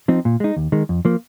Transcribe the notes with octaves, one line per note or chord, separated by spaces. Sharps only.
F3 C4 D#4
A#2
G#3 D#4
D#2
D#3 G#3
F2
F3 A#3